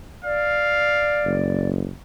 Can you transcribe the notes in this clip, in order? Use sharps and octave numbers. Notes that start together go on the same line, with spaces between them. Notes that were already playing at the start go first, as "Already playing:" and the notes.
D5 F5
F#1